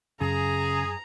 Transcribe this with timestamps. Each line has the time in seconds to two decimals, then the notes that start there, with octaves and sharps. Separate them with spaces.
0.21 F#2 C#3 G#4 A#5